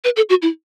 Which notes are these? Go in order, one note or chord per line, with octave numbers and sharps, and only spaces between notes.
B4
A4
F#4
E4